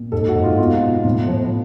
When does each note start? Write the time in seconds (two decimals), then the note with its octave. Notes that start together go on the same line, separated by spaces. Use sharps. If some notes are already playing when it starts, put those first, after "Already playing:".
Already playing: A#2
0.12 G#2 A4
0.28 F#4
0.36 G#2
0.44 F4
0.58 B2 F4
0.82 B2
1.05 A2
1.28 F3